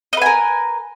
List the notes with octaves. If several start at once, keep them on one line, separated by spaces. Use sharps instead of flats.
A#4 B4 D#5 G#5